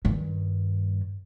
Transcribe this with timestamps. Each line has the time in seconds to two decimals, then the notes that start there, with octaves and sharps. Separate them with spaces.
0.05 G2 D#3